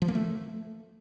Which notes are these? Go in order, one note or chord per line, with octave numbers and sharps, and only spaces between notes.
F3
A#3
A3